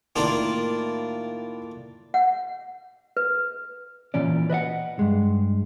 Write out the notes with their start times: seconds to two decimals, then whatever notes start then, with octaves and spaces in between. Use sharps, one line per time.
0.16 A2 D#3 A#3 D4 F4
2.14 F#5
3.17 B4
4.14 A#2 E3 C#4 D5
4.50 B4 D#5 E5 F#5
4.99 G2 G#3